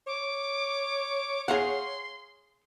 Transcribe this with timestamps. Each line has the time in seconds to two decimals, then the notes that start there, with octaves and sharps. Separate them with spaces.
0.07 C#5 D6
1.48 G#4 F5 F#5 C6